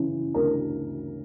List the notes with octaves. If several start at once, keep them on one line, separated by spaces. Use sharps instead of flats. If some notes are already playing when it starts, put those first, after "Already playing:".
Already playing: C#3 E3
D2 A#4